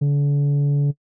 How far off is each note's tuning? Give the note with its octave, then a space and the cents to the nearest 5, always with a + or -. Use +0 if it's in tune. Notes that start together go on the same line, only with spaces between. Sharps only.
D3 -40